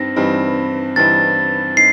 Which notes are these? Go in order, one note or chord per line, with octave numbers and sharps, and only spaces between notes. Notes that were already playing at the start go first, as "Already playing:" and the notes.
Already playing: G2 G3 C4 D#4 A#6
G2 E3 G3 C4 D#4
G2 E3 G3 C4 D#4 A6
D#4 C7